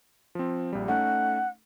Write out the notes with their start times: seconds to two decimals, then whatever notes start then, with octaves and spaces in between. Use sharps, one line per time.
0.35 F3 C4
0.73 A#1 G3
0.88 A3 C#4 D#4 F#5